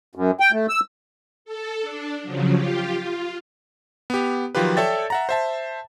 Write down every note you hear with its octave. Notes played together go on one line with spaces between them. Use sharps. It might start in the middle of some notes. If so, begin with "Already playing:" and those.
F#2
G5
A3
E6
A4
D4
C#3 F3 F#3
F4 G4
F4
B3 G4
D#3 F3 F#3 F4 G4 B4
A4 C#5 D5 E5 G5 A6
E5 F#5 A#5
C5 E5 A5